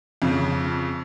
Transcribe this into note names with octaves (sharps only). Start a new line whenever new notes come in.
F2 C#3